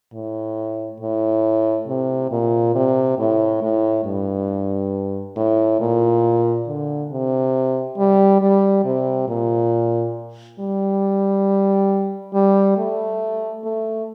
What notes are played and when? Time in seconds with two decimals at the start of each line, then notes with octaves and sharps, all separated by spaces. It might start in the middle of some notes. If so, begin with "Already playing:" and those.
0.13 A2
1.00 A2
1.88 C3
2.31 A#2
2.75 C3
3.18 A2
3.62 A2
4.05 G2
5.36 A2
5.80 A#2
6.67 D3
7.11 C3
7.97 G3
8.41 G3
8.85 C3
9.28 A#2
10.59 G3
12.34 G3
12.77 A3
13.64 A3